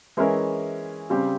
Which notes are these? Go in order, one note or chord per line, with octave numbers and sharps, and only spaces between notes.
E3 G#3 C#4 E4 A#4
C#3 G3 C4 G4